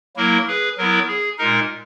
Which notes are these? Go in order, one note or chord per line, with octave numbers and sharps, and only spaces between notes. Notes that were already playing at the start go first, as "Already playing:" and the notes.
F#3 A#3 E4 A#4
G#4 B4
F#3 B3 E4 A#4
G#4
A#2 G#3 D#4 A#4